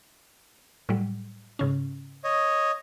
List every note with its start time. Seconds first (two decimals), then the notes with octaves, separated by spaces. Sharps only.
0.89 A2 F#3 G3
1.59 G#2 C#3 C#4
2.24 C#5 D#5